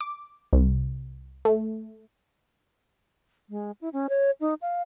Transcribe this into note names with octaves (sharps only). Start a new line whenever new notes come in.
D6
C2
A3
G#3
E4
C#4
C#5
D#4
F5